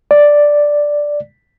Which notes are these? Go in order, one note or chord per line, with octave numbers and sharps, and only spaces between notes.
D5